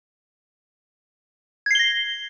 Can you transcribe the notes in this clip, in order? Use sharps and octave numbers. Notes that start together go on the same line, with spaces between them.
G#6 A#6 C7 G7